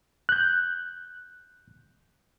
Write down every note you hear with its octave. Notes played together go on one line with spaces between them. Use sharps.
F#6 G6